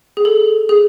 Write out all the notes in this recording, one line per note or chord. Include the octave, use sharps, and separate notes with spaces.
G#4
A4
G#4